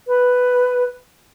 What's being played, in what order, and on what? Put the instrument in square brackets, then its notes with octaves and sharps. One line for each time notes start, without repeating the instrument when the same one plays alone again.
[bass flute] B4